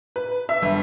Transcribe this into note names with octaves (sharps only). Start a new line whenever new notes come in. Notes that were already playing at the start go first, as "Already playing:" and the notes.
B4
E5
G1